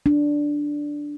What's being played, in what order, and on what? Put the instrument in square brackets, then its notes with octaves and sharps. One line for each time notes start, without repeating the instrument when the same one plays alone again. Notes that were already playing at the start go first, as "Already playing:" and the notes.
[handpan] D4